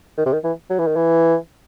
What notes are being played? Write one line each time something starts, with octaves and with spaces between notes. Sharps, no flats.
D#3
C3
D#3
E3
F#3
E3
D#3
E3